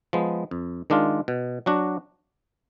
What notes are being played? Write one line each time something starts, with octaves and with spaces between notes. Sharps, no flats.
F3 G#3 B3
F2
D#3 G#3 D4 F4
B2
F#3 D4 F#4